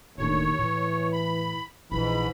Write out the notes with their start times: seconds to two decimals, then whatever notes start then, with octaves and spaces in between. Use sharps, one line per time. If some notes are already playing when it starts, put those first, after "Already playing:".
0.18 E1 D#2 A2 D4 C#5
0.59 A2 E3
1.13 B5
1.91 A#1 G#2 E3 B5